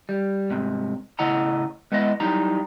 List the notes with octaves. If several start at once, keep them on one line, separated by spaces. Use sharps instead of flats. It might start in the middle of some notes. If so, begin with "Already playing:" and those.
G3
C2 G#2 C3
A2 C#3 E4 D#5 F#5 A#5
G#3 B3 E4 D#5
F#3 G3 D#4 E4 A#5